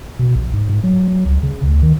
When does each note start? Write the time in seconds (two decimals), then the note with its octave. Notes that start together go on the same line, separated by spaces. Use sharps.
0.19 B2
0.35 A#1
0.54 G#2
0.69 G#2
0.83 F#3
1.08 F#3
1.26 C#2
1.43 C#3
1.63 D2
1.83 D#3